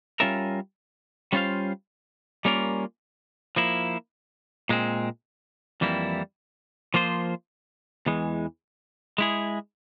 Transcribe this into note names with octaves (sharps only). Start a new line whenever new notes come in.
G3 C#4 F4 A#4 E5
G3 C#4 F4 C5 F5
G3 A#3 C#4 F4 A#4
F3 A#3 E4
A#2 G#3 C4
F2 E3 G3 A#3 E4
F3 A#3 F4 C5
E2 E3 G#3
G#3 E4 G#4